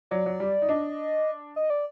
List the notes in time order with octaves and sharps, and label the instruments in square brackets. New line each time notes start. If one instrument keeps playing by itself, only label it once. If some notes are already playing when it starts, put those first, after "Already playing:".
[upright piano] F#3 [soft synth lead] D5
[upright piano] F#3
G3
D#4
[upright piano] D4 [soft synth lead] D#5
[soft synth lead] D#5
D5